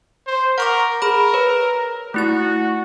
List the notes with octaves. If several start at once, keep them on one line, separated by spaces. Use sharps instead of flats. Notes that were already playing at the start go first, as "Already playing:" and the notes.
C5
A#4 F#5 C#6 D6
G#4 A#4 B5
B4 C#5
A3 E4 F#4 A6